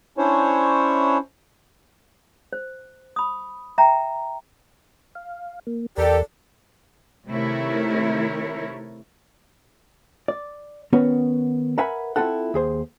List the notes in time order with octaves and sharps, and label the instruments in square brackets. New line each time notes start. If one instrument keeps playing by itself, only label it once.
[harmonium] C#4 D4 E4 C5 C#5
[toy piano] C5
B5 D#6
E5 G5 A#5
[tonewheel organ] F5
A#3
[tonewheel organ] E2 A#4 [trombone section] G4 A4 [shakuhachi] D5
[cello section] C3 D#3 A3 E4 A#4 C#5
[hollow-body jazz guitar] D5
D#3 B3 C#4 F#4 C#5
A#4 B4 E5 F#5 G#5 B5
C4 E4 F4 A4 F#5
D#2 G#4 C5